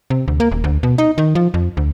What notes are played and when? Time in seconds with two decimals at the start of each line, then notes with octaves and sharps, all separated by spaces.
0.10 C3
0.28 D2
0.40 A#3
0.52 D#1
0.64 D2
0.83 B2
0.98 D#4
1.18 D#3
1.35 F3
1.54 F2
1.77 D2